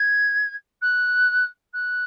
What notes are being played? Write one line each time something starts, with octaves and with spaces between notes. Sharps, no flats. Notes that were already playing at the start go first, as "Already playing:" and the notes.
Already playing: G#6
F#6
F#6